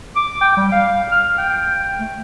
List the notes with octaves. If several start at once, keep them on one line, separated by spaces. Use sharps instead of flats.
D6
G5
G3
F5
F6
G5
A3